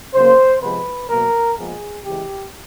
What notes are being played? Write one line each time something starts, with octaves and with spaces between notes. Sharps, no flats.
C#3 F#3 A#3 C5
C3 F3 G#3 B3 B4
B2 F#3 A#3 A#4
A#2 F3 G#3 B3 G#4
C#3 E3 G#3 G4